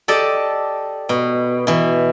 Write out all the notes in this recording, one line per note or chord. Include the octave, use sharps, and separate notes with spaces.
G4 A4 D5 D#5
B2
B2 E3